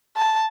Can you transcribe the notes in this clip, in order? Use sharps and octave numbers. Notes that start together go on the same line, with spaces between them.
A5